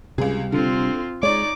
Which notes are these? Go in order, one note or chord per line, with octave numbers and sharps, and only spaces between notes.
C#2 C3 G3 G#4
D3 C4 F4
G#3 D#4 C#5 D5 D6